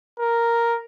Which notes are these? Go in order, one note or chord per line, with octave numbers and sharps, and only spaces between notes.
A#4